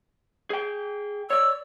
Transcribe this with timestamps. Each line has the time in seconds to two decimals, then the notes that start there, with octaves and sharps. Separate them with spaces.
0.50 G#4 G5
1.30 C#5 D5 E6